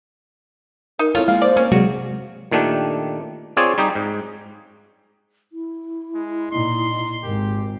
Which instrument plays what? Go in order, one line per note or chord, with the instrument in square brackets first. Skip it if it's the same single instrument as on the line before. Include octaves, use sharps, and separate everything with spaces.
[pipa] D#4 [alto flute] A#4
[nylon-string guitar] C4 A4 C#5 [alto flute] E4 [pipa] F4
[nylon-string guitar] G#3 A#3 [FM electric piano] F5
[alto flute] C5 [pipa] D5
[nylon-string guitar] A#3 C4 [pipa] C#4
[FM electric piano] C3 F#3 G#3 [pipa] F#4 [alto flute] G#4
[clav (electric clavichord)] A#2 D#3 A3 D4 G4
C4 F4 G#4 C#5 D5 G#5
G3 D#4 G4 G#4
G#2
[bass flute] E4
[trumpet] G#3
[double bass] A#2 D#4 [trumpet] C6
[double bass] G#1 G#2 [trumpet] G4 [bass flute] A#4